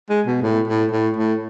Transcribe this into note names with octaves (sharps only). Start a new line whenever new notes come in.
G#3
B2
A2
A2
A2
A2